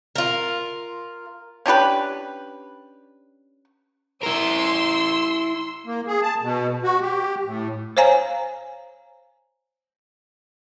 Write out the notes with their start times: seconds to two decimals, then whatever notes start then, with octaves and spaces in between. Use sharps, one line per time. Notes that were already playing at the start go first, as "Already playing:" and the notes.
0.16 F4 A#4
1.66 C#4 D4 G4 B4
4.23 E4 A#4 C6 E6
5.86 A#3
6.07 G#4
6.23 A5
6.42 B2
6.83 F#4
7.01 G4
7.45 A2
7.97 C5 C#5 F5 G#5 A#5